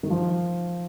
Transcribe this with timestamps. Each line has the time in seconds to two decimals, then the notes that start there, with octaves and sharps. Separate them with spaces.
0.03 D#3
0.10 F3